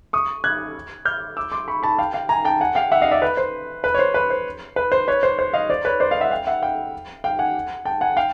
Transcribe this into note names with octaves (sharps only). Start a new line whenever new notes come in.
C#6 D#6
F#6 G#6
F6 G6
D6 E6
C6 D6
B5 C#6
A5 B5
F5 G5
F5 G5
G#5 A#5
G5 A5
F#5 G#5
F5 G5
E5 F#5
D#5 F5
D5 E5
B4
C5
B4
C#5
C5
B4
C5
B4
C5
B4 C#5
C5
C5
D#5 F5
C5 D5
B4 C#5
C5 D5
D#5 F5
E5 F#5
F5 G5
E5 F#5
F5 G5
F5 G5
F#5 G#5
G5 A5
F#5 G#5
F5 G5